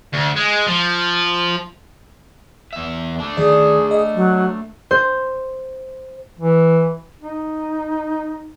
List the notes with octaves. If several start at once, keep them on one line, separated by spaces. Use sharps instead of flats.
D2
G#3
F3
E2 E5
A3 D4
D#3 G#4 D5
D#5
F#3
C5
E3
D#4